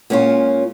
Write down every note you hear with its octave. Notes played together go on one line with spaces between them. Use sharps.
A#2 G#3 C#4 F4